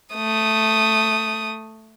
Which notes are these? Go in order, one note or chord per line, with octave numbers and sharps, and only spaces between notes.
A3 D#6